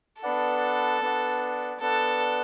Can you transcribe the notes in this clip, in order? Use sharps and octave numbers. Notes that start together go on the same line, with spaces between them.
B3 D4 A4 B4 D5 F#5
B3 D4 B4 D5 F#5
B3 D4 A4 B4 D5 F#5